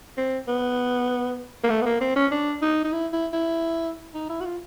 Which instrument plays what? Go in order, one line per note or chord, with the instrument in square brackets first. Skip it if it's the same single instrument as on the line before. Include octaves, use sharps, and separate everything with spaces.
[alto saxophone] C4
B3
A#3
A3
B3
A#3
C4
C#4
D4
D#4
D#4
E4
E4
E4
D#4
E4
F#4
F4